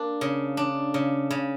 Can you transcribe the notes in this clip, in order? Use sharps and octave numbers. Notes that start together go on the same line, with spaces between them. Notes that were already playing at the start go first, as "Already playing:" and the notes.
Already playing: A#3 D4
C#3
D4
C#3
C#3